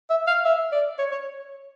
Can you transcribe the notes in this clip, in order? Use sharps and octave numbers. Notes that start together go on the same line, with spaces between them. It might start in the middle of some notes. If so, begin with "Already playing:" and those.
E5
F5
E5
D5
C#5
C#5